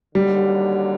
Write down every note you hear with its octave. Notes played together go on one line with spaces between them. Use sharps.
D#2 D3 F#3 G3